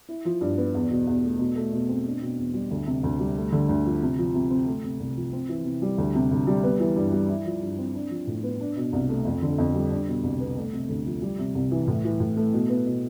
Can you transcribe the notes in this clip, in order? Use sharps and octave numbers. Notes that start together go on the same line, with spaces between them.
E4
F3
G2
B3
E2
B2
E2
A3
B2
A3
B2
C4
D4
B2
E2
G3
D2
C3
D2
G3
A3
D3
D2
F3
C3
F3
C3
C4
A3
C3
C2
F3
C4
E3
C3
G3
D2
C3
D2
G3
B3
E3
G2
G3
E4
F3
G2
C4
D4
F3
A2
B3
D4
B2
C2
A3
F2
D3
F2
G3
D4
B2
C2
B3
A3
C3
D2
F3
G3
C3
C2
E3
A2
E3
A2
A3
B2
B3
B2